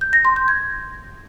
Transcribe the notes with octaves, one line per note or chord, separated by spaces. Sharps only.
G6
A#6
C6
G6
G#6